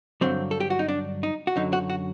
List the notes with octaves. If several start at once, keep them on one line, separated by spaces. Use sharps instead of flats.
G2 D3 F#3 C4
A4
G4
F#4
D#4
D4
D#4
F#4
F#2 D3 F#3 D#4
F#4
F#4